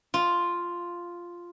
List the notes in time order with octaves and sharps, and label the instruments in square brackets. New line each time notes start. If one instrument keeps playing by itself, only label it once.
[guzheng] F4